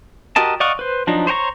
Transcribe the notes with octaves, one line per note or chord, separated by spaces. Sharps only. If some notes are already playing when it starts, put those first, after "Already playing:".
F#4 G4 A#4 D#5 A5
D5 D#5 F5 F#5 C#6
B4 C5
F3 F#3 D4 D#4
C5 C#5 G5 A#5 C#6